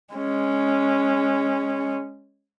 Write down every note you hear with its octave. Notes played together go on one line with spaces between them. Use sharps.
G#3 C#4